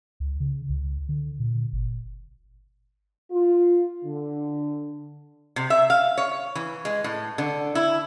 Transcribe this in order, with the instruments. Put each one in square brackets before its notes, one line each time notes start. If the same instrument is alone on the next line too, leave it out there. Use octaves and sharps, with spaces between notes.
[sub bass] C#2
C#3
C#2
D3
A#2
G1
[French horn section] F4
D3
[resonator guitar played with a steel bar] C3
E5
F5
C#5
E3
G#3
A2
D3
E4